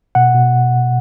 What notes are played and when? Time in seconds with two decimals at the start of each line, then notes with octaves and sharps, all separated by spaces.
0.15 B2 F#5
0.34 B2